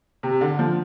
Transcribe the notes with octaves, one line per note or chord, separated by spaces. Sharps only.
C3
D3
F3